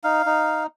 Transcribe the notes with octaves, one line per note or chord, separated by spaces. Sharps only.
D#4 F5
D#4